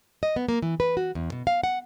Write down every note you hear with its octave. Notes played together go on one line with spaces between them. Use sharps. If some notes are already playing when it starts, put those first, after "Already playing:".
D#5
B3
A#3
E3
B4
F#4
E2
B2
F5
F#5